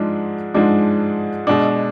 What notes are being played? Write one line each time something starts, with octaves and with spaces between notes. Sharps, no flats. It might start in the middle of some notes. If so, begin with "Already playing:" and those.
Already playing: G#2 F3 G#3 D4
G#2 F3 G#3 D4
B2 G#3 D4